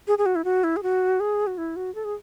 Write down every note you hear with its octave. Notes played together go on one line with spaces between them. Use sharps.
G#4
G#4
F#4
E4
F#4
E4
G#4
F#4
G#4
F#4
E4
F#4
A4
G#4